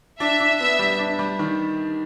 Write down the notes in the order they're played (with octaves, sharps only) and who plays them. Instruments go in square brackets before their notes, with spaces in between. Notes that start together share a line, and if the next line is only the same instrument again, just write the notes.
[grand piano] D4 [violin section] E5
[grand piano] D4
[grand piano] B3 [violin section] E5
[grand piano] G3
D4
G3
D#3